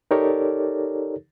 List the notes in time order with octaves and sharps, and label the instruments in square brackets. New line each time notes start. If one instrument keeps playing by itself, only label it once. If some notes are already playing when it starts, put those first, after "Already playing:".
[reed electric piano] D#4 G4 A4 A#4 C#5 D5